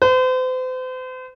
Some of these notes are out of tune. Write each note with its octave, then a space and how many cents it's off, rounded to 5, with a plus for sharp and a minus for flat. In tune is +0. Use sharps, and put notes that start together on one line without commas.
C5 -40